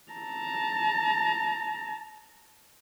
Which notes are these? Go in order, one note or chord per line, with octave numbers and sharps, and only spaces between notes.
A5 A#5